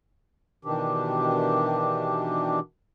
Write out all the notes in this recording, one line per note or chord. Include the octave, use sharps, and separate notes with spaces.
B2 D#3 E3 D4 G4